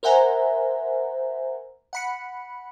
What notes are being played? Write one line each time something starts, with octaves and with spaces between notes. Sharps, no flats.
A#4 C5 E5 F#5 G#5 A#5
F#5 B5 C#7